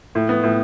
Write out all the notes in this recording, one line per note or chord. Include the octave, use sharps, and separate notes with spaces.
A2
B3
A2